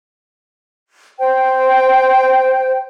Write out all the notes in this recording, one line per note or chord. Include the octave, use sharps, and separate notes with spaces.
C5 G5